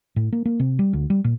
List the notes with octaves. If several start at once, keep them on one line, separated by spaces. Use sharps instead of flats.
A2
A#3
A#3
C3
G3
D2
G3
A#2